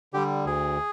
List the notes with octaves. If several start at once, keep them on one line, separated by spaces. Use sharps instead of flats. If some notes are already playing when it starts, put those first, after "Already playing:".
D3 G3 G4
D2 G#4